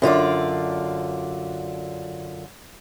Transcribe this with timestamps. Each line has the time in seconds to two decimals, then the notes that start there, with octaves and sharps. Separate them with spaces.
0.02 F#2 D3 F4 D5